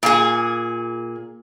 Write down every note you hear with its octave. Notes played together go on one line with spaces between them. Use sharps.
A#2 G#4